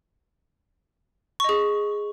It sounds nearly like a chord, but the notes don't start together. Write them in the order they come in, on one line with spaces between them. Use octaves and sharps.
C#6 D#5 G#4